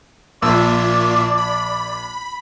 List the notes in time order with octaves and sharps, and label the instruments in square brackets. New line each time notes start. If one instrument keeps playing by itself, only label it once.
[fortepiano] A#1 E6 [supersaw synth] A#2 F4 E5 [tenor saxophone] D5
[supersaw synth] B5